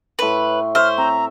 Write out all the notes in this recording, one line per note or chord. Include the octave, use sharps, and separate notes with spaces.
A2 B4 C#5 C6
C5 C#5 E5 F6
C4 A#5